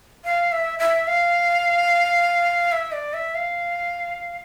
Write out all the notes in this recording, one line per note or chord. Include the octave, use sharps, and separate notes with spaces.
F5
E5
E5
F5
E5
D5
E5
F5